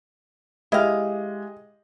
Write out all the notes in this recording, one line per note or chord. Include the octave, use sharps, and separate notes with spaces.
G#3 E4 G4 D#5 F5